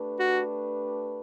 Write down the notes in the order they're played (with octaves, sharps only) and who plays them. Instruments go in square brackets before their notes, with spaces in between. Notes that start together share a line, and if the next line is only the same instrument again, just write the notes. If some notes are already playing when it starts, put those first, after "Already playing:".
Already playing: [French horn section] A3 D4 G4 B4
[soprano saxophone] F#4